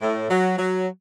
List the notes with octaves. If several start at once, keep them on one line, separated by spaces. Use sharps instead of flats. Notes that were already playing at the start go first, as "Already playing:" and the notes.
A2
F#3
F#3